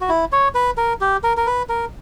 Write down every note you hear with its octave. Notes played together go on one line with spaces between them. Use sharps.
F#4
E4
C#5
B4
A#4
G4
A#4
A#4
B4
A#4